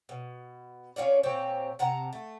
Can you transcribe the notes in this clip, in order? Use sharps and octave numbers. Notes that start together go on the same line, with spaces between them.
B2
C#4 F4 C#5 D5
A#2 C4 G4 C#5
C3 F#5 A5 A#5
A3